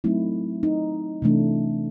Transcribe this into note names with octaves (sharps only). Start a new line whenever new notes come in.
F#3 A3 C4 D#4 E4
D#4
C3 E3 A3 D4